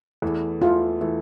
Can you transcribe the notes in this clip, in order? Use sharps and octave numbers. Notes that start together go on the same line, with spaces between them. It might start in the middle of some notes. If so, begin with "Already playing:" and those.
E2 E3 A3
E2 E3 A3 F4
E3 A3